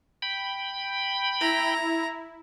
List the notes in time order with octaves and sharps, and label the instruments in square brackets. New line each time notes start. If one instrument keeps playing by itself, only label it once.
[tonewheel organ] G5 B5
[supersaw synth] E4 [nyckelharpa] A#5